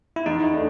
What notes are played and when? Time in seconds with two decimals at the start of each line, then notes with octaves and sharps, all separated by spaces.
0.16 E4
0.26 E2 D#4
0.53 A3 D4